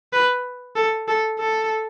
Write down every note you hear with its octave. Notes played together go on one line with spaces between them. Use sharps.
B4
A4
A4
A4